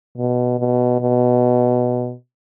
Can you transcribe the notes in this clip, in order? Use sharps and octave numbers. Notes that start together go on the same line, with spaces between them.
B2
B2
B2